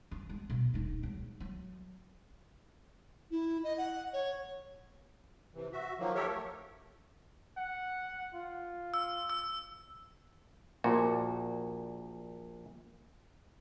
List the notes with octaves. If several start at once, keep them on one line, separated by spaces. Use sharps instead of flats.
C#4
G#3
B2
D#1 D#4
F#3 G#3
F#3
E4
D#5
F#5
C#5
C3 E3
F#4 E5
D#3 F3 F#3 A#3
G4 A4 A#4 C#5 E5
A3
F#5
F4
E6
E6
A#1 A#2 F#4